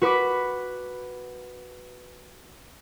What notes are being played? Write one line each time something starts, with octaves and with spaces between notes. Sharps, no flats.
F#4 B4 B5 D6